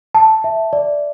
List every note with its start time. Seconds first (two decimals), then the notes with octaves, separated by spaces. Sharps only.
0.15 A5
0.44 E5
0.73 D5